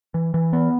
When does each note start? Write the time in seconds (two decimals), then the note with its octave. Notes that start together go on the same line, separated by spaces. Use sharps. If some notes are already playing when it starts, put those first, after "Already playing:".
0.14 E3
0.34 E3
0.53 B3